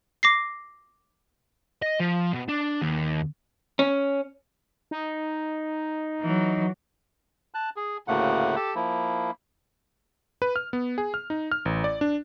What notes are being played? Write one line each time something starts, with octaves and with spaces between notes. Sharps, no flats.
D6 A#6 C7
D#5
F3
B2
D4
D#2
C#4
D#4
E3 F#3
A5 F#6
G#4
D2 A2 C#3 A3 A#3 F#5
G4 A4 A5
F3 A#3 E4
B4
F6
B3
G#4
F6
D#4
F6
A1
D5
D4